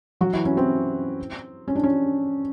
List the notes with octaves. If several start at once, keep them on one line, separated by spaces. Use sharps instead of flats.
F#3 F#4
E3 E4
C#4
C4
C#4
D4
C#4